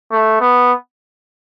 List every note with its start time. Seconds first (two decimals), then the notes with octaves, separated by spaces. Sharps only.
0.11 A3
0.41 B3